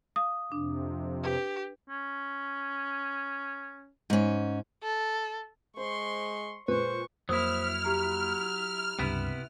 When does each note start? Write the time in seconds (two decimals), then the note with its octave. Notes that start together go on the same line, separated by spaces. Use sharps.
0.16 F5 D#6
0.52 F2 C3 D4
1.23 G4 B4
1.90 C#4
4.10 G#2 C#4
4.83 A4
5.77 G#3 C5 C6 C#6
6.68 A#2 G#3 B4 C5 C#6
7.29 F2 F#3 A#3 E4 C5 D#6 F6
7.85 G4 A#5
8.99 C#2 G2 C3 B3 E4